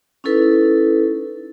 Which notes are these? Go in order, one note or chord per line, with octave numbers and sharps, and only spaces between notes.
C#4 D#4 E4 A4 B4